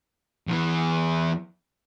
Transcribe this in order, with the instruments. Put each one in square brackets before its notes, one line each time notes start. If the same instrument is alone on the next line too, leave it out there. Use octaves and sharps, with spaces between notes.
[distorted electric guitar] E2 E3